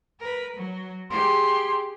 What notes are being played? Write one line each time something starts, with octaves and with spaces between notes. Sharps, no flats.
A#4 B4
F#3
G4 G#4 C6